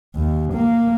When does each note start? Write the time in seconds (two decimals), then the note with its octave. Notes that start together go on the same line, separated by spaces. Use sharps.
0.16 D#2
0.53 A#3